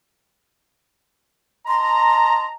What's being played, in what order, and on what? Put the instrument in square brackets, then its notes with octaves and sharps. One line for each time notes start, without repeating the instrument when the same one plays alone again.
[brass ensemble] D#5 A5 A#5 [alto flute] C6